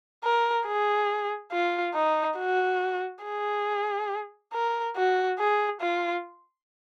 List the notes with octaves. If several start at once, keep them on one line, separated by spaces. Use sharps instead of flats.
A#4
G#4
F4
D#4
F#4
G#4
A#4
F#4
G#4
F4